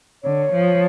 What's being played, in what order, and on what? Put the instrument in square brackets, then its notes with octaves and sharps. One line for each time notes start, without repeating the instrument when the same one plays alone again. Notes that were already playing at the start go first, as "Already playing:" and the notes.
[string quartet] D3 [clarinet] C#5
[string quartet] F3